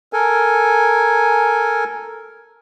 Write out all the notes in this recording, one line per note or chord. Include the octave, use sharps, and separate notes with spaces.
A4 A#4 G#5